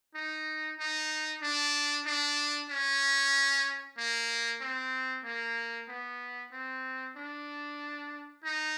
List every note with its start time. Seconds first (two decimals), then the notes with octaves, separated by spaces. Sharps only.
0.15 D#4
0.79 D#4
1.43 D4
2.06 D4
2.70 C#4
3.98 A#3
4.61 C4
5.25 A#3
5.89 B3
6.52 C4
7.16 D4
8.44 D#4